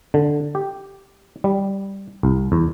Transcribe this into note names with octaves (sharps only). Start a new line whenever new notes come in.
D3
G4
G3
C2
E2